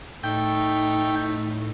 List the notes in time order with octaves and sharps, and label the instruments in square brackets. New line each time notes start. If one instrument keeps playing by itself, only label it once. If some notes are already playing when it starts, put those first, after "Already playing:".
[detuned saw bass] A2 [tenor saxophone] A3 [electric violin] D#4 [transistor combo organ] G5